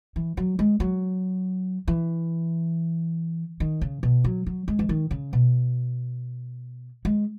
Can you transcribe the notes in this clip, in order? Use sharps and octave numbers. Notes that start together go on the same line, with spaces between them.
E3
F#3
G#3
F#3
E3
D#3
C#3
B2
F#3
F#3
G#3
E3
D#3
C#3
B2
G#3